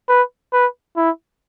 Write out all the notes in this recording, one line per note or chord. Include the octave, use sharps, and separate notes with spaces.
B4
B4
E4